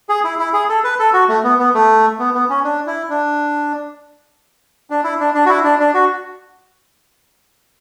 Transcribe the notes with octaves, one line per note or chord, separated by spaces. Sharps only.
G#4
E4
E4
G#4
A4
B4
A4
F#4
A3
B3
B3
A3
B3
B3
C#4
D4
E4
D4
D4
E4
D4
D4
F#4
E4
D4
D4
F#4